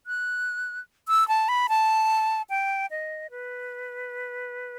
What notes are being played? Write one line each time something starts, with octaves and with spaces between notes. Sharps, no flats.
F#6
E6
A5
B5
A5
G5
D#5
B4